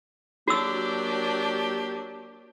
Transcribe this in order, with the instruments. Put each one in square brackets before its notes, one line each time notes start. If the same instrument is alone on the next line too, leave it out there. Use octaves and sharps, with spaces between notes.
[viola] F#3 D4 [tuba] A#3 [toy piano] F#4 E6 [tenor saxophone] G4